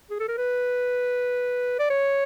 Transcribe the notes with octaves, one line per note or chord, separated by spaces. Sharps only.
G#4
A4
A#4
B4
D5
C#5